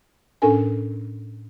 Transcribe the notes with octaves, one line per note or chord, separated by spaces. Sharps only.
A2 C#4 D4 A4 A#4 G#5